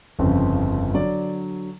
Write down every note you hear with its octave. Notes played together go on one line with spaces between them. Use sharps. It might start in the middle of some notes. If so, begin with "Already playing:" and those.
G1 F2 C#3 F3
D3 F#3 D5